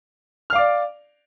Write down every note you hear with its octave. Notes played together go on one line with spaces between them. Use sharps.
D5 F5 D6 F6